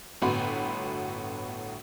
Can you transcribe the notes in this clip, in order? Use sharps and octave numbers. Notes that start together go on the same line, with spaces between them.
G1 A2 B3 F#4 B5 C6